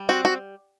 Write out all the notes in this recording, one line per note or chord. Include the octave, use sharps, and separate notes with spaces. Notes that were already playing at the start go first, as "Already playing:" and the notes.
Already playing: G3
C4 F#4
F#4